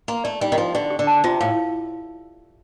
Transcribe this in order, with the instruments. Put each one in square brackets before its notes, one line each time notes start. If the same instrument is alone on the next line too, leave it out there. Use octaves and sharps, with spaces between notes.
[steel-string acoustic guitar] A#3 [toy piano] C6
[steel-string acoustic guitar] A3 [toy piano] D5
[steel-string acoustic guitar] G3 [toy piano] D#4
[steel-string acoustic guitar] D#3
[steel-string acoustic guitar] F3 [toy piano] D#4
[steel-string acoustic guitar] D3 [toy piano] G4
[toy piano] G4
[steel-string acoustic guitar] D3
[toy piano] A5
[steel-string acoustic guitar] C3 [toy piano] F4
[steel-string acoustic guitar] A2 [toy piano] F5